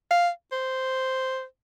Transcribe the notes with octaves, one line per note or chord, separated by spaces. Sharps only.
F5
C5